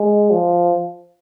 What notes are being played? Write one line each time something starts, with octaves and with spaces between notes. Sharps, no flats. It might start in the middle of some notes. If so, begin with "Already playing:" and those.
Already playing: G#3
F3